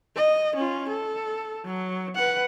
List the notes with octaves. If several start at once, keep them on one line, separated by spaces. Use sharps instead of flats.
D#5
C#4 F4
A4
F#3
B4 F#5